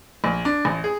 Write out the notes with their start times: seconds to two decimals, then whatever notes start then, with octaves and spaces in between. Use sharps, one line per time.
0.24 A#1
0.45 D4
0.65 A1
0.84 G#4